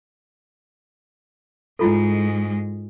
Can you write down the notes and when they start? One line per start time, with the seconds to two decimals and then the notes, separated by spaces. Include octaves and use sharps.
1.79 G#2 G#3 E4 F4 A4